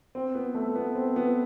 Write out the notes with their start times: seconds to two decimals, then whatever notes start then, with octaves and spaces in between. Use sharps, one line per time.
0.15 C4
0.35 B3
0.54 A3
0.76 B3
0.95 C4
1.16 B3